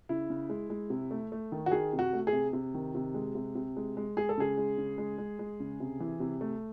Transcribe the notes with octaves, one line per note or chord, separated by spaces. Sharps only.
C#3 E4
C#3
G#3
G#3
C3
A3
A3
D#3
F#4
D#3 G#4
C3
F#4
A3
G#4
C3
C3
D#3
C3
G#3
C3
C3
G#3
G#3
G#3 G#4
A4
C#3 G#4
G#3
C#3
G#3
G#3
G#3
C#3
C3
E3
C3
A3